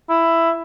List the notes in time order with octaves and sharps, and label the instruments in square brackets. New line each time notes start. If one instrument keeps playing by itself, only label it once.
[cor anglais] E4